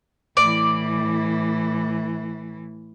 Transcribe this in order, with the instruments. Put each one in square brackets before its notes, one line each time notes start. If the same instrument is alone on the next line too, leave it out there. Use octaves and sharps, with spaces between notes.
[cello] A2 E3 [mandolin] D5